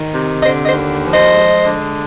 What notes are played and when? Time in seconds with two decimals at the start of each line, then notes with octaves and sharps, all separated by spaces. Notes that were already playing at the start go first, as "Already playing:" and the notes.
Already playing: D#3
0.13 C3
0.43 D3 C5 D#5
0.66 C5 D#5
0.73 D#2
1.04 F3
1.11 C5 D#5
1.34 G#3
1.64 D3